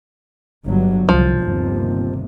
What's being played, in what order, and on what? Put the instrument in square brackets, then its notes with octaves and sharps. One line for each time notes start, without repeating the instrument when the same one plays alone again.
[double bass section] G1 G2 F#3
[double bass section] C2 [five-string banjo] F3
[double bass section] G1 D#2 C3